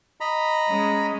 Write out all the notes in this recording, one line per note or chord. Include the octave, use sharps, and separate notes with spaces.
D#5 A#5 B5
G#3 C#4